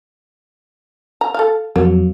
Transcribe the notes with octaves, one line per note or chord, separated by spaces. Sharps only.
A#5
A4 F5
F2 F#3 A#3